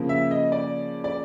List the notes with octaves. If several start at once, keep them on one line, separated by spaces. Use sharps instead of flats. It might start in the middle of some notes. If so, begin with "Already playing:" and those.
Already playing: C#3 F3 A#3
E5
D#5
D5
D5